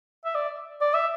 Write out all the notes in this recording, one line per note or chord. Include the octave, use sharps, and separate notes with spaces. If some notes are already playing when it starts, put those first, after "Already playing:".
E5
D5
D5
E5